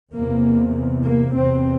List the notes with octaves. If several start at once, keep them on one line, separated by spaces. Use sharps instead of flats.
E2 C3 A#3
A#3
E2 C3 C4